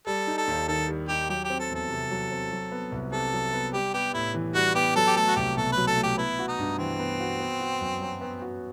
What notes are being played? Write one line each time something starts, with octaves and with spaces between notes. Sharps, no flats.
G3 A4
D#4
A4
D#2
D#3 A4
G3
D#4 G4
F#3 G4
G4
C4
A4
E2 A4
C3
F#3
C4
F#3
B3
C2
C3 A4
F#3
B3
G3 G4
B3 G4
A2 E4
E3
G3 F#4
B3 G4
F#3 A4
G4
A3 A4
F#4
C2 G4
B2 A4
F#3 B4
A4
A3
G4
B3 E4
F#4
D#4
G2
E3 C4
B3
F#4
B3
F#4
F#2
F#3
B3
F#4